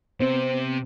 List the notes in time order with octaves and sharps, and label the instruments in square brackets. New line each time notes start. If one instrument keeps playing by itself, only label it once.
[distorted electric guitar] C3 [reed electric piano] B3 C4 [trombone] C5